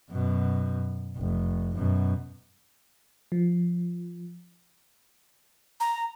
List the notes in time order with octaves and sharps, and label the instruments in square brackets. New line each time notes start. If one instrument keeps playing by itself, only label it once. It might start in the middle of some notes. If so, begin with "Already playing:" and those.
[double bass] F#2 B2
F1
F#2 B2
[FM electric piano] F3
[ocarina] A#5